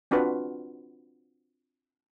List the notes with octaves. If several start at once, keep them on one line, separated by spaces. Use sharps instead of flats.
C4 D4 F4 F#4 B4